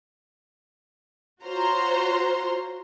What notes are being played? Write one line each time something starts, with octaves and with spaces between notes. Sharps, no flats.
F4 F#4 C5 C#5 A#5 C6